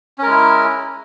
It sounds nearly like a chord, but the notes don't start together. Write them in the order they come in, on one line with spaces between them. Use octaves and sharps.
C#4 A#4 G#3 E4